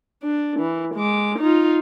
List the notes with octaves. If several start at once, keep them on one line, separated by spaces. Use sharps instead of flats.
D4
E3
G#3 D6
D#4 F4